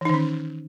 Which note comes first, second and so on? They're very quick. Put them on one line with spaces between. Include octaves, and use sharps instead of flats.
E3 D#4 D#3 C#4